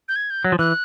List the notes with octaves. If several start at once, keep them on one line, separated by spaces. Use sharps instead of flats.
G6
G#6
G6
F#3
F3
E3 F#6